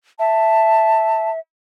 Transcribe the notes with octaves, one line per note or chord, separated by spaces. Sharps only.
E5 A5